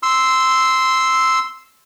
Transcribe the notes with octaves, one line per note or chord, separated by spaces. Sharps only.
C6 E6